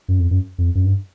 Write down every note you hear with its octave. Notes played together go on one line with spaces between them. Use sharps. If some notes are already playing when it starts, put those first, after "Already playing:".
F#2
F2
F#2
F2
F#2
G2